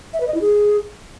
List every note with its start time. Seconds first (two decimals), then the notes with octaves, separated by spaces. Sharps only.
0.13 E5
0.20 B4
0.27 D#5
0.34 E4
0.41 G#4